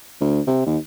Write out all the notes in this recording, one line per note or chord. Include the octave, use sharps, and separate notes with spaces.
D2
C3
D#2